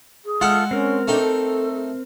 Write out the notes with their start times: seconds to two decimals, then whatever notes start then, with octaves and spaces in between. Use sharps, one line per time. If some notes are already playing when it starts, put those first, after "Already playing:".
0.25 G#4
0.41 G#3 F4 A4 E5 F#5 F6
0.71 C4 C#4 A#4
1.08 A3 D4 D#4 G5
1.21 A4